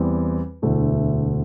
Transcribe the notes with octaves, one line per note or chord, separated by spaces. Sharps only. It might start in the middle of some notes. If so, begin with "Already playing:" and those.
Already playing: E2 E3 G3 C4
E1 D2 D3 A3 E4